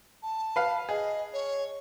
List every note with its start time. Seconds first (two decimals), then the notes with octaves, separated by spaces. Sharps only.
0.22 A5
0.56 B4 F5
0.89 G#4 D#5
1.33 C#5